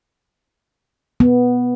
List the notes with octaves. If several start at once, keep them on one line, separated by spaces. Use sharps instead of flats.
B3